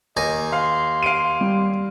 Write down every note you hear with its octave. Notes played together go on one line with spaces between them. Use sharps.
D#2 D#5 G#5 A#5
F5 C6
F5 D7 D#7
G3